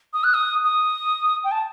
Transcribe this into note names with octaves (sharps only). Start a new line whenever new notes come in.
D#6
F#6
D#6
D#6
G5
A5